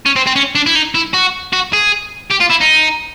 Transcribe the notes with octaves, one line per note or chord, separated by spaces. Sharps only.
C#4
C4
C4
C#4
D4
E4
D#4
E4
F#4
F#4
G#4
G4
F4
E4
D#4